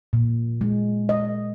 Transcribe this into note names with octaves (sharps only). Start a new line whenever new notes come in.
A#2
G#3
D#5